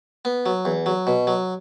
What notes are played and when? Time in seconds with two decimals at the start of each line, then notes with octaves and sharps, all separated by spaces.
0.25 B3
0.46 F#3
0.65 E2
0.86 F#3
1.07 B2
1.27 F#3